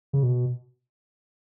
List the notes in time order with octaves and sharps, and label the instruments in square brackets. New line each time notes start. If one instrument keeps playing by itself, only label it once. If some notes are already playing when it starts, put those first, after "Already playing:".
[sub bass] C#3
B2